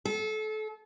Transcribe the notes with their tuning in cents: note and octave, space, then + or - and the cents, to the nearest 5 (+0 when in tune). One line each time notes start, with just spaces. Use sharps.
A4 -30